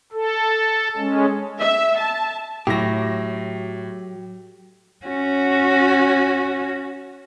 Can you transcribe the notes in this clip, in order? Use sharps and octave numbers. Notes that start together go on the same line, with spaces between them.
A4
G#3 C#4
E5
A5
A2 F#3 G4 A#6
C#4 F#4